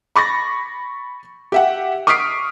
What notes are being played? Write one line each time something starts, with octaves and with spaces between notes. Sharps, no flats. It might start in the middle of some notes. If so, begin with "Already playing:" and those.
B5 C#6 A6 A#6
G4 E5 F#5
C#6 D#6 F6 B6 C7 D7